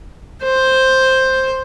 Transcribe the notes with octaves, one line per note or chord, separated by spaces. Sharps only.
C5